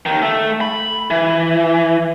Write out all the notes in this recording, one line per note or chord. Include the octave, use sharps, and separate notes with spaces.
D#2 D#3
A3
B5
E3